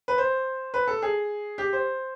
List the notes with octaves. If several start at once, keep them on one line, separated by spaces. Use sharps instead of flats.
B4
C5
B4
A4
G#4
G4
C5